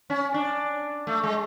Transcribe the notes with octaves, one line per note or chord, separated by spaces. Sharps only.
C#4
D4
A3
G#3